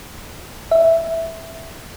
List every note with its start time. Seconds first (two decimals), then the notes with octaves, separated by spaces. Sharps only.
0.71 E5